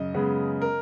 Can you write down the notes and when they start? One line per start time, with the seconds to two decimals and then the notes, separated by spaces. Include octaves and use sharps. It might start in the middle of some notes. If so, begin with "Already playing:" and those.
Already playing: F#2 C#3 D#5
0.14 C#3 G#3 B3
0.62 A#4